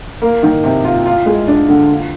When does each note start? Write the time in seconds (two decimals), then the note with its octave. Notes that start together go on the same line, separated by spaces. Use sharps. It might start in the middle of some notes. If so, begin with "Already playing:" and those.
0.22 A#3
0.43 D#3
0.63 C3
0.84 F4
1.06 F4
1.26 G#3
1.48 D4
1.69 D3
1.89 F4